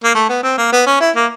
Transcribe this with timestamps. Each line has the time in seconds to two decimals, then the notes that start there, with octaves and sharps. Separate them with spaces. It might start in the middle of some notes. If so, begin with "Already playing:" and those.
0.04 A#3
0.15 A3
0.29 B3
0.43 C4
0.58 A#3
0.72 B3
0.86 C#4
1.00 E4
1.16 A#3